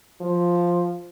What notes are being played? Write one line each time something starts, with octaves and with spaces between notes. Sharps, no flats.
F3